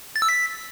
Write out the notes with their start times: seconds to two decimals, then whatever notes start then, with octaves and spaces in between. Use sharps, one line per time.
0.16 A6
0.22 E6
0.29 B6